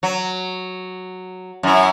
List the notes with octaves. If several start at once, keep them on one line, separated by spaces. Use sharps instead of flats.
F#3
F#2 E4